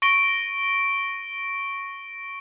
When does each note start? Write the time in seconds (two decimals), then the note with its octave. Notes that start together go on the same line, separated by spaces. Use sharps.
0.02 C#6 A#6 D7 G7